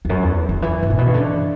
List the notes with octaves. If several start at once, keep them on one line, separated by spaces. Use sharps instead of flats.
E2
F#2
E2
D3
E3
G2
A#2
B2
C#3
D3